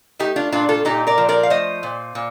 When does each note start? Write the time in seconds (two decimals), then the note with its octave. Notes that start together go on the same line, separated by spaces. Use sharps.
0.19 A3 D#4 G4
0.36 D4 F4
0.52 A#2 D4 F4
0.69 F4 A4
0.85 A#2 D#4 G4
1.07 A#4 D5
1.18 F3
1.29 A#4 D5
1.43 F5
1.50 A3 C5 D#5
1.83 A#2
2.15 A#2